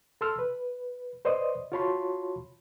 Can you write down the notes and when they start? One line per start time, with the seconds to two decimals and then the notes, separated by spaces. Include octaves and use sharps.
0.21 A4 A5 C6 E6 F6
0.39 B4
1.25 B4 C5 D5 D#5 C6 D#6
1.72 F4 F#4 C#5 A5 B5 C6